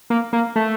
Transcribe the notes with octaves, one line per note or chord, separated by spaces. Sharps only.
A#3
A#3
A3